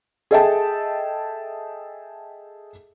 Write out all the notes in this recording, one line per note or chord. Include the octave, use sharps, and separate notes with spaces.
G#4 A4 D#5 E5 G5 A5